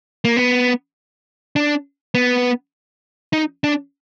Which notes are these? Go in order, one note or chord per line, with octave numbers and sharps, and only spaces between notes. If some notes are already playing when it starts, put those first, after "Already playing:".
A#3
B3
D4
B3
D#4
D4